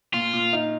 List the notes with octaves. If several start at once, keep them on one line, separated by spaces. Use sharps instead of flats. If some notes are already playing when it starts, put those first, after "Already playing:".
A#2 F4
A#2
D#4